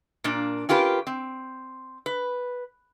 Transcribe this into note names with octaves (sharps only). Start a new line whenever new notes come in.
A#2 A#3 D4
C#4 F4 G4 A#4 B4
C4
B4